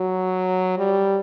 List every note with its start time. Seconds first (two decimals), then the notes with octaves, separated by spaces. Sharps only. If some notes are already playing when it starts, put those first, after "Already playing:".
Already playing: F#3
0.78 G3